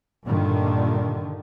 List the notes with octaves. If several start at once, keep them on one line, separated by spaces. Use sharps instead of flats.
G2 A#2 D3 D#3